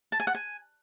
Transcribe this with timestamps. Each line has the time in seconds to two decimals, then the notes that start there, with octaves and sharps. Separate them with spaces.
0.12 A5
0.20 G#5
0.27 F#5
0.35 G#5